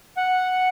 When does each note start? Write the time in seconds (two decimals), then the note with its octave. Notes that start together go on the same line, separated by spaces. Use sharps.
0.17 F#5